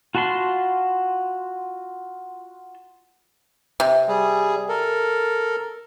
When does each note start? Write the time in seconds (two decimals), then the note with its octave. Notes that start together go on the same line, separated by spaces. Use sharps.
0.15 F4 F#4 A5 B5 C6
3.80 C3
4.08 G3 G#4
4.69 A4 A#4